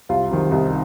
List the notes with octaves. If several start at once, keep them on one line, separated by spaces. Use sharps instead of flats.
C2 F4
C3 D#3
C2 D#4